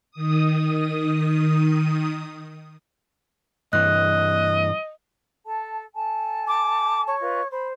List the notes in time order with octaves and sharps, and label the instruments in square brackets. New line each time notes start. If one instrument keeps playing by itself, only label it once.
[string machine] D#3 D#6
[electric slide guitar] G2 E3 [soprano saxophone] D#5 [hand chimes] F#6
[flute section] A4 A5
A4 G#5 A5
[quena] D6
C#5
[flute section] F4 B4 D#5
[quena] C5 [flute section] B5